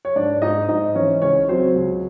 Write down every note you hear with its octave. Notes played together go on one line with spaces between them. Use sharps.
C#5
G#2 D4 D5
G#2 D#4 D#5
G#2 D#4 D#5
E3 C#4 C#5
C#2 C#4 C#5
F#3 C4 C5
C#2